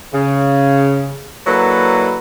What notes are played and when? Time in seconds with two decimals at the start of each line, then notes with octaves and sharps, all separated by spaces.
0.13 C#3
1.46 F#3 A#3 D4 E4 A4 B4